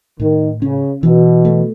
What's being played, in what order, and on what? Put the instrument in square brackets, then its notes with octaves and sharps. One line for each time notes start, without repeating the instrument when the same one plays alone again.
[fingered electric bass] A2 [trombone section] D#3
[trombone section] C#3 [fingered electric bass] C#4
[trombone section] B2 [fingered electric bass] E3
[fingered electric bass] A3